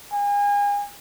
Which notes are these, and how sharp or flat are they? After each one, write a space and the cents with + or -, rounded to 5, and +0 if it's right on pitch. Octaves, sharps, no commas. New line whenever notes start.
G#5 -35